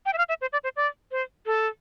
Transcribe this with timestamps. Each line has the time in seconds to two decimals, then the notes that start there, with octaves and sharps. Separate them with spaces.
0.06 G5
0.13 E5
0.18 F5
0.29 E5
0.41 C5
0.53 D5
0.64 C5
0.76 D5
1.11 C5
1.46 A4